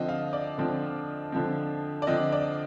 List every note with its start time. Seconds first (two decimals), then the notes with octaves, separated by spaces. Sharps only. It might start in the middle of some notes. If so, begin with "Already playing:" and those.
Already playing: D3 F3 C4 D#5
0.09 F5
0.33 D5
0.58 D3 F3 C4
1.32 D3 F3 C4
2.02 D5
2.07 D3 F3 C4 D#5
2.32 D5